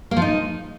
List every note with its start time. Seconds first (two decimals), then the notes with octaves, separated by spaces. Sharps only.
0.11 A#3
0.17 F3
0.22 D#4